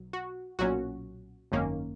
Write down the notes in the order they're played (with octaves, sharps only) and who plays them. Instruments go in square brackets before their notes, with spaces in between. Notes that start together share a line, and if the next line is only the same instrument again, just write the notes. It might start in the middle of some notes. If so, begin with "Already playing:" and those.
Already playing: [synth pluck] B1 F#3
F#4
B1 A#2 F#3 C#4 F#4
G#1 F#2 D#3 A#3 C#4